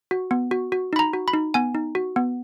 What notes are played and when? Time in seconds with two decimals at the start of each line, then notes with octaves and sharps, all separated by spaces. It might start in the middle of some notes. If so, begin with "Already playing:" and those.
0.11 F#4
0.31 B3
0.51 F#4
0.72 F#4
0.93 D#4 B5
0.99 A#5
1.13 F#4
1.28 B5
1.34 D#4
1.54 B3 G#5
1.75 D#4
1.95 F#4
2.16 B3